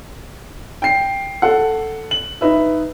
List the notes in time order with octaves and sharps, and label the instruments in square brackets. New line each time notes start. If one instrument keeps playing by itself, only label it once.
[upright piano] G5 C7
A4 F#5
F#7
D#4 B4 E5